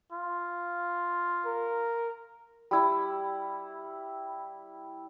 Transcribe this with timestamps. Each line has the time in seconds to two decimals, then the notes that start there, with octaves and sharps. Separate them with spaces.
0.12 F4
1.46 A#4
2.71 G3 E4